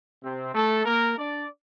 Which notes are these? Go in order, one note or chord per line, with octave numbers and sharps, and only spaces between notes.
C3 C4
A3 A4
A#3 A#4
D4 D5